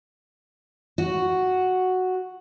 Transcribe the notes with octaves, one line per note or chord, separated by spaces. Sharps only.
F#4